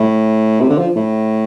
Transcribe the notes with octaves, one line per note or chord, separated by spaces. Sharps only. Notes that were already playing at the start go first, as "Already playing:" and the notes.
Already playing: A2
C3
D3
F3
A2